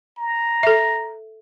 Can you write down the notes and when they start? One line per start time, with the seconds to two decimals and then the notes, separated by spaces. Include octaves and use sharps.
0.18 A#5
0.63 A4 E5